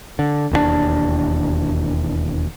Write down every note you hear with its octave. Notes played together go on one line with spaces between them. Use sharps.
D3
E1 D#2 E3 D4